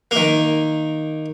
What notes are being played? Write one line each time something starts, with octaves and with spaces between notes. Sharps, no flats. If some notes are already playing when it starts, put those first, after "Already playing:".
D#3 A#3